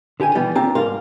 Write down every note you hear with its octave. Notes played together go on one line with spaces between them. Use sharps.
D3 G4 G5 G#5
B2 E3 G3 B3
A#3 C4 D4 F4 G4 A5
G#2 G3 A#4 F5 C6